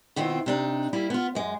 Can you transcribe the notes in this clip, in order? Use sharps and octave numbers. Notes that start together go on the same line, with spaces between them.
B2 D#3 C4 E4 F4
C3 D4 D#4
G3 A#3 E4
B3 F4
F#2 G#3